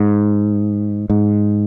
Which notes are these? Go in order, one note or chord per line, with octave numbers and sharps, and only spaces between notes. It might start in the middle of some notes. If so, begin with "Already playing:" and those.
Already playing: G#2
G#2